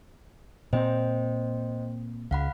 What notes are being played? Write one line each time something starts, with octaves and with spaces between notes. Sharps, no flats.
A#2 C4 C5 D#5 G5
C#2 F5 F#5 B5